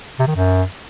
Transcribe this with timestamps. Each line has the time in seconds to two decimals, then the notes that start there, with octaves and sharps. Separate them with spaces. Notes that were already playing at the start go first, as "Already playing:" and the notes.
0.19 C3
0.27 D#3
0.35 F#2